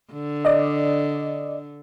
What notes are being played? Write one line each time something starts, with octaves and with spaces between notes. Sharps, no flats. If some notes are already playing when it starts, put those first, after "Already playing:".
D3
D5 D#5